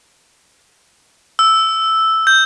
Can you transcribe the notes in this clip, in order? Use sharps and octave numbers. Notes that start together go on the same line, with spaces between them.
E6
G6